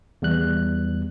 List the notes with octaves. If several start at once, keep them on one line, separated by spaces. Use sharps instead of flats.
E2 G3 F#6